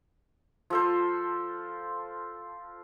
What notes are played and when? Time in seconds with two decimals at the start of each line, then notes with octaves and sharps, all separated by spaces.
0.70 F3 A4 C5